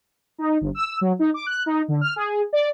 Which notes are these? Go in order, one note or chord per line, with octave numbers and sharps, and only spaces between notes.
D#4
G1
E6
F#3
D#4
D6
F#6
D#4
D3
F6
G#4
D5